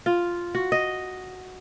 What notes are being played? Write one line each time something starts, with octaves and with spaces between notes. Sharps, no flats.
F4
F#4
D#5